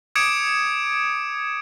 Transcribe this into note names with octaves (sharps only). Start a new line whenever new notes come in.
D6 D#6 G#6 C#7 D7 E7